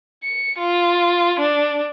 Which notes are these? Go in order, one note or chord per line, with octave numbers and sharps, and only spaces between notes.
C#7
F4
D4